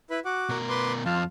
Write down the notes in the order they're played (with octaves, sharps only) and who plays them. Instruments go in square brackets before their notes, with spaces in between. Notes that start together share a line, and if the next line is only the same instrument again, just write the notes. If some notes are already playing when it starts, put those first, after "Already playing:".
[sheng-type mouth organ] E4 B4 B5
F#4 F#5 D6
[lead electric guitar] B2 A#4
[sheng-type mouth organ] B4 C6 D6
[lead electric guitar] F2 [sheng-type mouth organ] F4 F5 A5